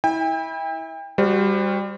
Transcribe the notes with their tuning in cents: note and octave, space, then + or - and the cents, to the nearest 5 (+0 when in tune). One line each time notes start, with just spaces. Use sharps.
E4 -25 G5 +35
G3 +20 F#4 +0 C5 -5